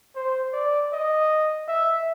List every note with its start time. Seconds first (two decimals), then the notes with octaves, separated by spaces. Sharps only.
0.16 C5
0.53 D5
0.93 D#5
1.68 E5